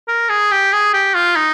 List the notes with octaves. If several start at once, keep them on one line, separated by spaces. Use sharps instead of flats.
A#4
G#4
G4
G#4
G4
F4
D#4